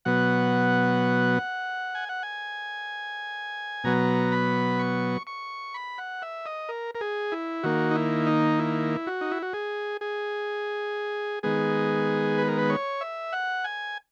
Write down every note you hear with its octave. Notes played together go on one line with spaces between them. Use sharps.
B2 F#3 B3 F#5
G#5
F#5
G#5
B2 F#3 B3 A#5
B5
C#6
C#6
B5
F#5
E5
D#5
A#4
A#4
G#4
E4
D#3 A#3 F#4
D#4
E4
D#4
E4
F#4
D#4
E4
F#4
G#4
G#4
D#3 G#3 B3 G#4
B4
A#4
B4
C#5
E5
F#5
G#5